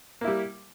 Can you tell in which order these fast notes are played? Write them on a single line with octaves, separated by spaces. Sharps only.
A#3 E4 G3